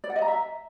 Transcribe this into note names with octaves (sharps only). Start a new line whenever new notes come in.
D5
F#5
D#5
A#5
E5